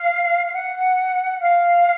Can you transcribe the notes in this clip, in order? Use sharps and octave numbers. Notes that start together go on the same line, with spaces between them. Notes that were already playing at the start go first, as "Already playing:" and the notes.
Already playing: F5
F5
F#5
F5